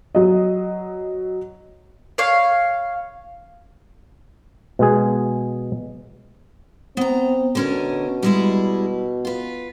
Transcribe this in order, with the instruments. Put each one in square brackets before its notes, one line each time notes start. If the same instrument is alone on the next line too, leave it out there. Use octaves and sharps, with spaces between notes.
[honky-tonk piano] F#3 D#5
[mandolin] C#5 F5
[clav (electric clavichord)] B2 G#3 G#4
[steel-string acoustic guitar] B3 A#5 [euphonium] C4
[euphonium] B2 [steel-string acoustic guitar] D3 C#4 A#4
[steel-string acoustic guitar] G3 G#3 E4
F4 B4